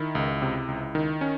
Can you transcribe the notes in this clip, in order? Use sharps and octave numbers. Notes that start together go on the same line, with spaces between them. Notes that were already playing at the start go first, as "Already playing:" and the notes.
Already playing: D#3 E4
C#2
C3
C#2
D#3
C#4